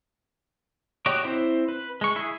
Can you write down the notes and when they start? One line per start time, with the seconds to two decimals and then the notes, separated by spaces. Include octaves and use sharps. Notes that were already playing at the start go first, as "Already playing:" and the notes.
1.06 F#4 G4 C#5 D#5 D6
1.24 C4 E4 C5
1.68 B4
2.01 G#3 C#6
2.16 E4 G#4